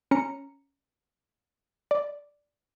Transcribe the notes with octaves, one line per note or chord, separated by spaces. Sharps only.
C#4 A#5 C#7
D5